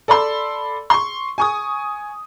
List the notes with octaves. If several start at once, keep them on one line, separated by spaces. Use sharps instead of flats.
A4 D5 B5 C6 E6
C6 C#6
G#5 C#6 D#6